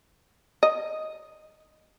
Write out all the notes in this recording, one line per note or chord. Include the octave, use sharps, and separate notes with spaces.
D#5